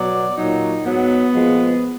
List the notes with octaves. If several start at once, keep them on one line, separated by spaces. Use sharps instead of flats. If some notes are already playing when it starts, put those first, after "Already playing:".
Already playing: B2 F#3 D5
A#2 F#3 D#4
G#2 F#3 B3
A#2 F3 G#3